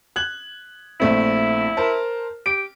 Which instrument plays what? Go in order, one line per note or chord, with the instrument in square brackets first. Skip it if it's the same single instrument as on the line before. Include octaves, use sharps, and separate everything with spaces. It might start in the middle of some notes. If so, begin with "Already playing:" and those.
[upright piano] F#6 G#6 F#7
[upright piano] A#1 A3 C4 [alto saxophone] E4
[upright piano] A#4 C5 A5
[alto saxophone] G4 [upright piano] D7